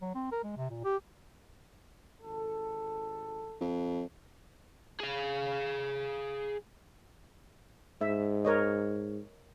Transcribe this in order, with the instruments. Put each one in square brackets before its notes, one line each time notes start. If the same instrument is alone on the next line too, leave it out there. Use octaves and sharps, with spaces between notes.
[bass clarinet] F#3
C4
A#4
G#3
C3
A#2
G4
[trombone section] G#1 A4
[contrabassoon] F2
[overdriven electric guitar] G#4 F5
[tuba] G#2 [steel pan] E5
[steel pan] A#4 C#5 D#5